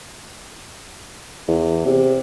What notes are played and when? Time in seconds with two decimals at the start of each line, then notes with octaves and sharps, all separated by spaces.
1.48 E2
1.86 C3